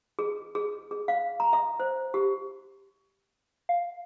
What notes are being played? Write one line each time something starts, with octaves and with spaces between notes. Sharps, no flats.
G#4
G#4
G#4
F5
A#5
E5
C5
G4
F5